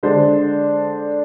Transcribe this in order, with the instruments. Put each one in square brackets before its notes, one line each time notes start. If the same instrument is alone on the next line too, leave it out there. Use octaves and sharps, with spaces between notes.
[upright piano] D3 G#3 D4 C5